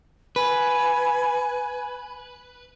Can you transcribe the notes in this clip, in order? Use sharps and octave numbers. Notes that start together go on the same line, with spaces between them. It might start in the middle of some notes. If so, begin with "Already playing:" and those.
B4 G#5